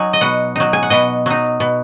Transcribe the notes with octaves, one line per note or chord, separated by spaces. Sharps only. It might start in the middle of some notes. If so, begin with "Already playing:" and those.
Already playing: F#3 D#4 G#5
D#5
B2 F#5
F#3 D#4
G#5
F#5
B2 D#5
F#3 D#4
B2